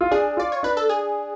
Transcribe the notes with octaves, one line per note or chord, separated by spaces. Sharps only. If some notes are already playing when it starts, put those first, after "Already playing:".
F4
D4 G#4
F4 D5
C#5
D4 B4
A4
G#4